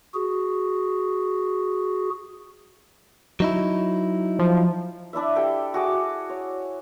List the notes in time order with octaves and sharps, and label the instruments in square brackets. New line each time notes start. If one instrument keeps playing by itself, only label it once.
[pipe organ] F#4 G#4
[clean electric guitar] F#3 D#4 E4
[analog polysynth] F3
[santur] D4 E4 D5 E5
G4 A4 G5
F#4 G#4 D6
C#5